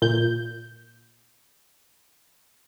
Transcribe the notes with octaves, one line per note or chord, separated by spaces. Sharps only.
A#2 G6